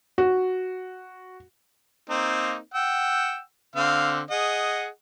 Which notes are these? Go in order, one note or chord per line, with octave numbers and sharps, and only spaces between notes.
F#4
A#3 C4 D#4
F#5 G5 E6
D3 C4 F5
G#4 D#5 F#5